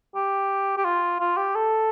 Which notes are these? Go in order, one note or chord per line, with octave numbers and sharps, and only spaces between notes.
G4
G4
F4
F4
G4
A4